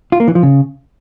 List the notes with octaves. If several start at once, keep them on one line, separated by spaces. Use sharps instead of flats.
F4
A#3
E3
F3
C#3